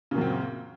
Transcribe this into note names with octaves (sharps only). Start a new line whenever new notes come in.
F#2 A#2 C#3 C4